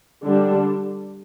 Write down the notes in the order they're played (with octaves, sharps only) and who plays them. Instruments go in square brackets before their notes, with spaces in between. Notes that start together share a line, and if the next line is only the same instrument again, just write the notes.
[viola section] D3 G3 D4